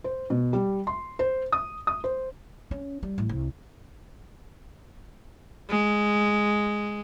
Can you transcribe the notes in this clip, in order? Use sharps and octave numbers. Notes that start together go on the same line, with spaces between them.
C5
B2
G3
C6
C5
D#6
D#6
C5
C#4
G3
A1
C2
G#3